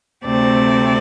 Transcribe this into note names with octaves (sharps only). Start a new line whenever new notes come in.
D2 C3 A3 C4 D5